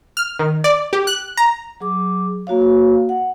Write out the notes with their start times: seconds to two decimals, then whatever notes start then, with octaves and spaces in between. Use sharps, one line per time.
0.17 F6
0.39 D#3
0.64 D5
0.93 G4
1.07 F#6
1.37 A#5
1.80 F#3 G#4 D6
2.47 A#3 F#4 C#5 F5
3.09 F#5